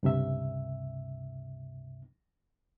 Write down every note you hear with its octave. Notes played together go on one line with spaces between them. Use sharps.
C#2 G2 C3 E5